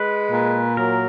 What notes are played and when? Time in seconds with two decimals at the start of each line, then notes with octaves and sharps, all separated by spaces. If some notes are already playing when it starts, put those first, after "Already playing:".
Already playing: G#3 B4
0.32 A#2
0.77 F#3 A#4